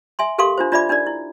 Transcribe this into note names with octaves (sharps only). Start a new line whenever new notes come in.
E5 G#5 C6
G4 A4 A#4 F5 C6 D6
D4 F4 C5
D4 F4 D5 E5 B5 D6
D4 D#4 A#4 D5
E4